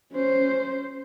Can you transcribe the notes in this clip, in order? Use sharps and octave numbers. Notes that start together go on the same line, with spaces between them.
C#4 C5